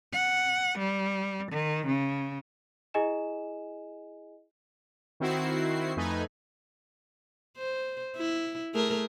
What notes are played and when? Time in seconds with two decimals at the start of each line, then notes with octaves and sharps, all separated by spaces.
0.13 F#5
0.79 G3
1.52 D#3
1.87 C#3
2.94 E4 G#4 D#5 G#5 E7
5.20 D#3 C4 E4 F#4 C7
5.97 F2 A3 D#4 B4 G#5
7.58 C5
8.16 E4
8.74 A3 G#4 A#4